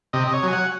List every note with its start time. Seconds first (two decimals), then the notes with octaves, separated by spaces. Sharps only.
0.13 C3 D#5
0.27 D#5
0.33 C#5
0.43 F#3 G#5
0.53 F#5